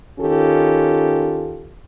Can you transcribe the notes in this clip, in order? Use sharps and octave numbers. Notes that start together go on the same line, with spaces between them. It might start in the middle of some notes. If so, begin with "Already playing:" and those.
D#3 C#4 F4 G4 A4